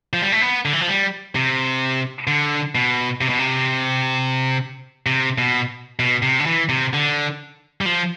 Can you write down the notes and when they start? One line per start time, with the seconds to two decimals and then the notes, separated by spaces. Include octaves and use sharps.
0.13 F3
0.22 G3
0.32 A3
0.41 B3
0.65 D3
0.73 E3
0.81 F3
0.88 G3
1.35 C3
2.27 D3
2.75 B2
3.21 C3
3.29 B2
3.39 C3
5.06 C3
5.38 B2
5.99 B2
6.23 C3
6.40 D3
6.46 E3
6.69 C3
6.93 D3
7.81 G3
7.86 F3